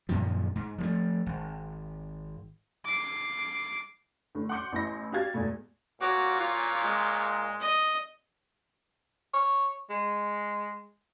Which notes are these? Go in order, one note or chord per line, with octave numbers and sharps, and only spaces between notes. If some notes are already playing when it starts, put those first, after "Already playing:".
F#2 A#2 D#3 F3
G#2
F3 F#3 A3
G#1
D6 C7
A2 D3
F#5 C6 D6 G6 C#7
A1 B3 E4 C6 A#6
F#4 G4 F5 G#6 A6
E2 G#2 B2 A3
A#2 F#4 C#5 D6
F4
G#3
D#5
C#5
G#3